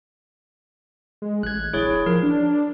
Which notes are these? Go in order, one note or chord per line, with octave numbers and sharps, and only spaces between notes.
G#3
A1 F#6 G#6
D1 E4 G#4 C#5
F3 A#4
D4